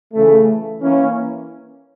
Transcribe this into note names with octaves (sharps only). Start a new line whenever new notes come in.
C#3 E3 A3
E3 A#3 C#4